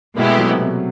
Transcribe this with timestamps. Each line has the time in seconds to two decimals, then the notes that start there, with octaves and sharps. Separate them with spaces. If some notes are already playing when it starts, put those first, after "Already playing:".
0.16 B2 G#3 A#3 B3 E4 G4
0.28 A3
0.38 F#3
0.50 C3
0.61 B2